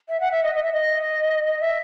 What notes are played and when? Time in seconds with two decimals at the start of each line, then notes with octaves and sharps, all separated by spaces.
0.09 E5
0.20 F#5
0.31 E5
0.43 D#5
0.54 D#5
0.63 E5
0.72 D#5
1.46 D#5
1.61 E5